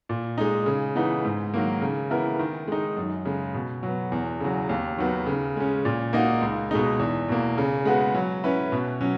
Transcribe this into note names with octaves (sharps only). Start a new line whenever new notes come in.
A#2
G#3 D#4
C#3
E3 B3 D#4
G#2
D#3 F#3 A#3
C#3
E3 B3 E4 A#4
D#3
G#3 D#4
F#2
C#3 G#3
B2
F#3 B3
E2
C#3 F#3
D#2
D#3 F#3 B3 F#4
C#3
G#3 C#4
A#2
A#3 D#4 F#4
C#2
B2 G#3 D#4
E2
B2 A#3
C#3
G#3 B3 F#4
F#3
C#4 E4 B4
B2
F#3 C#4